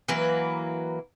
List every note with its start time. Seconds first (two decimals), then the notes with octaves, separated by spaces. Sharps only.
0.08 E3 F#3 A#3 B4